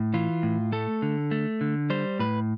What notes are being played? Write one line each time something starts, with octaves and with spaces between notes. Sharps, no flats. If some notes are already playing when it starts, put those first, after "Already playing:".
Already playing: A2
E3 F4
A2
A3 A4
D3
A3
D3
G3 C5
A2 B4